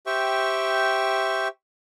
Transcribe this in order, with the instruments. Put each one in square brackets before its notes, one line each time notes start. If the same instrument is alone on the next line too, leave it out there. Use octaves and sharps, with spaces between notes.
[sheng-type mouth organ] G4 C5 E5 G5 C#6